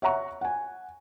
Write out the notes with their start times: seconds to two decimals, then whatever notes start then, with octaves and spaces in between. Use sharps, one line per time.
0.02 C#5 E5 F#5 A#5 C#6
0.41 F#5 G#5